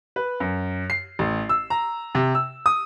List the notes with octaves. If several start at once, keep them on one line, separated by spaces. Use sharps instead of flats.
B4
F#2
C7
A1
E6
A#5
C3
E6
D#6